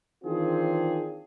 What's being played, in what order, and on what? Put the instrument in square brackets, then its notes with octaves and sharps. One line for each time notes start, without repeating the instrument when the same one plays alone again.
[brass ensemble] D#3 E3 C4 D4 F4 G#4